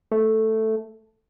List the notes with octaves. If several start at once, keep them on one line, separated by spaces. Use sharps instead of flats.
A3